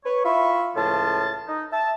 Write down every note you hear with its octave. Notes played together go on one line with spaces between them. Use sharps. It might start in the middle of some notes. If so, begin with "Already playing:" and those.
B4 C#5
E4 F4 E5 B5 C#6
C#2 A2 F3 F4 A5
D#4
E5 A5